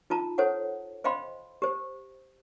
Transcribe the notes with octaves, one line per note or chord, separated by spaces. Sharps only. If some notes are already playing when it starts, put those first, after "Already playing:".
D#4 F4 A5 A#5
A4 C5 C#5 F#5
C5 D#5 F5 G5 B5 C6
G4 C5